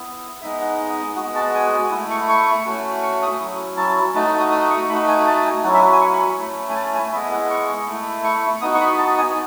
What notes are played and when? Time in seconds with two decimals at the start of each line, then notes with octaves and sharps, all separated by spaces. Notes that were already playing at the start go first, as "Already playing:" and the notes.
Already playing: B3 E4
0.41 G#3 B3 D#4 E5
0.61 F#5
1.16 G#3 B3 F#4 F#5
1.35 A5
1.54 G#5
1.91 E4 F#5
1.96 A3
2.10 C#6
2.29 C#6
2.66 A3 C#4 F#4
3.02 C#6
3.22 D#6
3.39 F#3 C#4 E4
3.77 A5
4.15 A3 D#4 F#4 A5
4.27 F#5
4.39 D#6
4.51 D#6
4.70 C#6
4.89 A3 D#4 F#4 B5
5.08 G#5
5.27 A5
5.39 A5
5.45 G#5
5.64 F#3 C#4 E4 F#5
5.73 E5
5.82 F#5
5.92 G#5
6.01 C#6
6.13 B5
6.38 A3 C#4 E4
6.69 G#5
6.76 A5
6.94 G#5
7.12 G#3 B3 E4 E5
7.31 F#5
7.50 C#6
7.86 A3
7.92 E4
8.24 C#6
8.61 B3 D#4 F#4 D#6
8.74 C#6
8.81 B5
8.86 C#6
8.98 A5
9.18 G#5